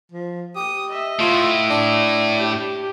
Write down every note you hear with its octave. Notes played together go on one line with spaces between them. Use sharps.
F3
G4 D#6
D#5 E5
A2 F4
D4
G4